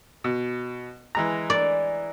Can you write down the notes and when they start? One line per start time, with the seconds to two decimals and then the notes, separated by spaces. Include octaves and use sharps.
0.24 B2
1.15 E3 G#3 A#5
1.50 D5